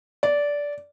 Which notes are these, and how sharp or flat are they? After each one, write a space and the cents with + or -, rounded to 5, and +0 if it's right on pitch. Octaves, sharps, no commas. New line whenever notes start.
D5 -15